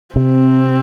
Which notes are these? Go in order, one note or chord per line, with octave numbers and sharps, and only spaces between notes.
C3 C4